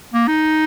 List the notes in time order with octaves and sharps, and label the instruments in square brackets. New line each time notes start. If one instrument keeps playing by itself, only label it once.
[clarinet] A#3
D#4